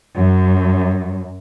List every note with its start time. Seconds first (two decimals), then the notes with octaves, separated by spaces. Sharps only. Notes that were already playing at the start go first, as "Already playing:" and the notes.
0.18 F#2